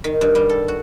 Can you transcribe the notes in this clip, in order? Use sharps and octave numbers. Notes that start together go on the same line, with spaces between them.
D#3
G2
G3
A4
F#4